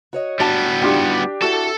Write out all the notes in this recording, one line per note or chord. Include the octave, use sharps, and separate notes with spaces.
F#4 C#5 D#5
A2 G3 B3 D4 F#4 A5
D4 D#4 F4 G4 G5
E4 F#4 A4 A5